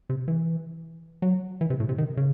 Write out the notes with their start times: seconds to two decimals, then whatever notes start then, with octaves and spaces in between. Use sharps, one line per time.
0.09 C3
0.28 E3
1.22 F#3
1.61 E3
1.70 C3
1.80 A2
1.89 C3
1.98 D#3
2.17 C#3